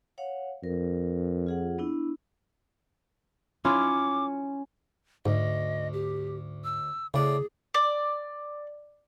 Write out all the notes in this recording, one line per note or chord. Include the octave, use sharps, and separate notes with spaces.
C#5 F5 F#5
F2 A#4
F4 G#4 F#5
B3 D4 E4
C#4 E4 F4 D6
D2 G#2 D#5
G4
E6
A2 C#3 G#4 D5
D5